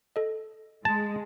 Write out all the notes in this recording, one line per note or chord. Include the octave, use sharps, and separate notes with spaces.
A4 D#5
G#3 A5